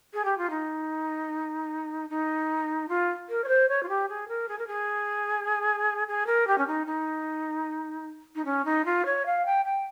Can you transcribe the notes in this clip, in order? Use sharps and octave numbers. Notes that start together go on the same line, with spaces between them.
G#4
G4
F4
D#4
D#4
F4
A#4
C#5
C5
C#5
F4
G4
G#4
A#4
G#4
A#4
G#4
G#4
A#4
G4
C#4
D#4
D#4
D#4
C#4
D#4
F4
C#5
F5
G5
G5